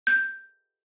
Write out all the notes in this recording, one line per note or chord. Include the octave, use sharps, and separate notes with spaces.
G6